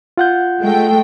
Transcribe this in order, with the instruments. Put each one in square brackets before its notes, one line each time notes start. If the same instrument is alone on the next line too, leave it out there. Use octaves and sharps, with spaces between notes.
[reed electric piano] F4 F#5 G6
[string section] G#3 A3 G5